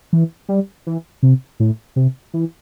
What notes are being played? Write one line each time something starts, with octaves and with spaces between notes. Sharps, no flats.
E3
G3
E3
C3
A2
C3
E3